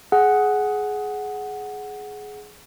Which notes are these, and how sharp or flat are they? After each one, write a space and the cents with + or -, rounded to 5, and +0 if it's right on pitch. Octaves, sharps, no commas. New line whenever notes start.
G#4 +15 F#5 +0